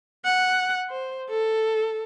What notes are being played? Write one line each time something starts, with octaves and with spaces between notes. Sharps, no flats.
F#5
C5
A4